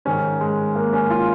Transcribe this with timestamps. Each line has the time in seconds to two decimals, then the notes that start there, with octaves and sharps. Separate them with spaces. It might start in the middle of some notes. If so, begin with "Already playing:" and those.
0.05 G#2 D#3 C#4
0.41 G#3
0.75 A#3
0.93 C#4
1.10 F4